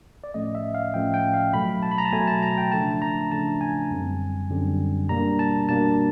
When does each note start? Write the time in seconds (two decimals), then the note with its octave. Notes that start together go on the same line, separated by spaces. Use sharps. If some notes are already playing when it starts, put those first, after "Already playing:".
0.24 D5
0.34 A2 F3 A3 C#4 D#5
0.55 E5
0.75 F5
0.94 A2 F3 A3 C#4 G5
1.14 G5
1.34 F5
1.53 B2 F#3 A3 B5
1.83 A5
1.91 B5
1.98 A#5
2.05 A5
2.12 B2 F#3 A3 G#5
2.27 A5
2.42 A#5
2.58 G5
2.72 C#3 F3 A3 D4 A5
3.02 A#5
3.31 C#3 F3 A3 D4 A5
3.61 G#5
3.91 F#2 D3 G3 C4
4.50 F#2 D3 G3 C4
5.09 B2 G3 A#3 D4 A#5
5.39 A5
5.69 B2 G3 A#3 D4 A5